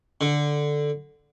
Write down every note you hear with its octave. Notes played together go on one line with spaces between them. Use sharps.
D3